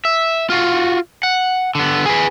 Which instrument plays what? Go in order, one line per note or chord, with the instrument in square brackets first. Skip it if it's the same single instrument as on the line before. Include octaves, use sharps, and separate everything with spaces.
[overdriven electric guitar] E5
F4 F#4
F#5
D3 B3
G#4 B4